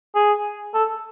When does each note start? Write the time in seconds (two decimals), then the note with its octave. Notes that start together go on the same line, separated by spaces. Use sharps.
0.15 G#4
0.74 A4